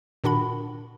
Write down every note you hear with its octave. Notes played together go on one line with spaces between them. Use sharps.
A#2 D#3 D4 F#4 F#5 B5